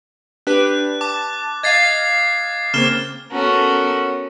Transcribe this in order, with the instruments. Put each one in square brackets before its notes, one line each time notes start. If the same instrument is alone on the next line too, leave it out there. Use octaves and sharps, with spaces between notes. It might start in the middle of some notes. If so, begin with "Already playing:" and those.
[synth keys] D4 G4 B4 [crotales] F#6
[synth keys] A5 [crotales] D6
[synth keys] D#5 F5 [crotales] G#6 A6 C7
[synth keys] C#3 A#3 C4 [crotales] F6 E7 G7
[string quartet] B3 C#4 F#4 A4 A#4